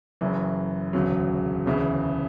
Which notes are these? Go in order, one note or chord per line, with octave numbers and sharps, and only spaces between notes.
F#1 F#2 E3
E1 D2 C#3 F#3
E1 D2 C#3 E3